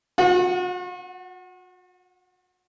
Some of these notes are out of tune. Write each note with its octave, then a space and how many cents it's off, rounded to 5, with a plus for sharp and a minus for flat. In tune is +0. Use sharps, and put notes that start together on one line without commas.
F#4 -45 F#5 +0